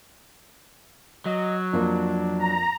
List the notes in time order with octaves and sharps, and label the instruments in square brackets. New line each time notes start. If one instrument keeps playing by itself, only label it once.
[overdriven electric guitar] F#3 [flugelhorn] D#5
[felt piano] F2 A#3 [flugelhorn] D4
[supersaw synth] A#5